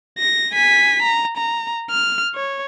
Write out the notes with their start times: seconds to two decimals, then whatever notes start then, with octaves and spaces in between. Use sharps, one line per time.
0.19 A#6
0.54 G#5 B6
1.03 A#5
1.37 A#5
1.90 F6
2.35 C#5